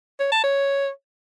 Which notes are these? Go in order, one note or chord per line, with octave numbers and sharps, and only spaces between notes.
C#5
A5
C#5